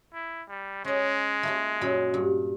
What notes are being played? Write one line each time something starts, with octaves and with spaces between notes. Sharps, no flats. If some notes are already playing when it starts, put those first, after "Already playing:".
E4
G3
G#3 C#4 D#5
A3 A#3 F4
F#2 A#2 B5
G2